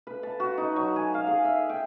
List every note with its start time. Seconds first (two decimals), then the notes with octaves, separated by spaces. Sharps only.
0.07 B4
0.23 A5
0.40 F#4
0.58 D#4
0.76 F#3
0.96 G#5
1.14 F5
1.27 G#4
1.45 E5
1.69 G5